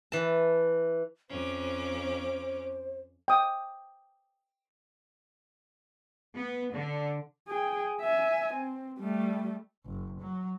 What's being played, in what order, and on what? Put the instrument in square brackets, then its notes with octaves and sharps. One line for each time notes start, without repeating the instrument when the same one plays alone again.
[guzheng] E3 A5
[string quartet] F2 C#4 D6 [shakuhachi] C5
[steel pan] G5 D#6
[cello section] B3
D3
[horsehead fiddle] G#4 G5
E5 G#5
C4
G3 A3
[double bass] F#1
F#3